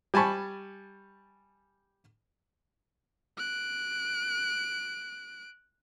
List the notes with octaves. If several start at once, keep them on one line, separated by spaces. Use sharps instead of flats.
G3 G#5 A5 B5 C#6
F#6 D7